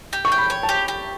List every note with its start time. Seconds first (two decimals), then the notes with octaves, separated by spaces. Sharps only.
0.13 G4
0.25 C#6
0.32 G5
0.38 B5
0.50 C#5
0.63 A5
0.69 G4
0.88 G4